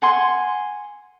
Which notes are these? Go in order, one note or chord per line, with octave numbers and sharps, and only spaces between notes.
F#5 G#5 C6